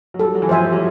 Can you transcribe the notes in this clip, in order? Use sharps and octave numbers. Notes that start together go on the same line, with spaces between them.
F#3
G3 A4
F#3
E3
F3 C5 E5 G#5
G3
F#3